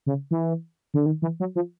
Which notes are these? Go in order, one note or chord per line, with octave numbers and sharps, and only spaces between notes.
C#3
E3
D3
D#3
E3
F#3
F3